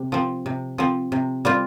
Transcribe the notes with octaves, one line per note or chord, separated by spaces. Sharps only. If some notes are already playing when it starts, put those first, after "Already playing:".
Already playing: C3
F3 C4
C3
F3 C4
C3
G3 C4 F4